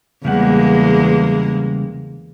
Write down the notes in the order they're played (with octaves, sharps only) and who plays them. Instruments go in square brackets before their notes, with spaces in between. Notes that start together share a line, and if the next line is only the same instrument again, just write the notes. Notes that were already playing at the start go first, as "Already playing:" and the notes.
[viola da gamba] E2 G#3 A#3 [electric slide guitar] C#3 G3 F#5